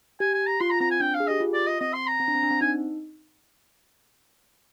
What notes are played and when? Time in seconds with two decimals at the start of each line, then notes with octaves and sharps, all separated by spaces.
0.20 G4 G#5
0.34 G#5
0.46 A#5
0.60 F4 C6
0.70 A#5
0.80 C4 A#5
0.91 G#5
1.00 D4 G5
1.14 F5
1.20 G#4
1.27 G4 D#5
1.40 F4
1.53 D5
1.67 D#5
1.80 C4 D#5
1.93 C6
2.07 A#5
2.20 C4
2.28 D4
2.35 C4
2.43 D4
2.51 C4
2.61 D#4 G#5